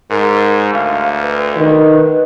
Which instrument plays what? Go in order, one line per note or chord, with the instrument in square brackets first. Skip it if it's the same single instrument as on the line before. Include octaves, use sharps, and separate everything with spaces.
[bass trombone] G#2 [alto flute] A#4
[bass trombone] D2 [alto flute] F5
[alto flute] B4
[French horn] D#3 [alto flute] B4